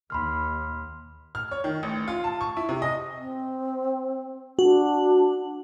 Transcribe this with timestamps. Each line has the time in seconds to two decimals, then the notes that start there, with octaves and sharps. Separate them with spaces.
0.10 D#2 B5 C6 F6
1.35 F6
1.51 C#5
1.64 D#3
1.83 A1
2.08 F4
2.24 A5
2.41 C#6
2.57 E4
2.69 C3
2.82 D#5
3.20 C4
4.59 D4 F#4